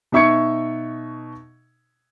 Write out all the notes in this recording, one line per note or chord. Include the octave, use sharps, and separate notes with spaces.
B2 D#4 E5 C#6 G#6 C#7